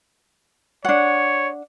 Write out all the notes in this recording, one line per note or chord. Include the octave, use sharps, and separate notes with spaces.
D4 C#5 F#5